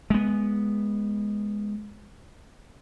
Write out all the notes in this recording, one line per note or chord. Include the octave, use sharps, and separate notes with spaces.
G#3 B3